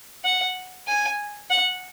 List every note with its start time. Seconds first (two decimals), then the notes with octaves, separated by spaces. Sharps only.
0.24 F#5
0.88 G#5
1.50 F#5